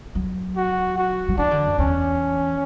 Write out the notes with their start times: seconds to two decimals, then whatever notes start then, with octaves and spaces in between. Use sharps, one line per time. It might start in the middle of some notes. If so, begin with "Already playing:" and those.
0.15 F#3
0.56 F#4
0.98 F#4
1.29 F#3
1.37 E3 D4
1.51 D3
1.65 F#2
1.79 E2 C#4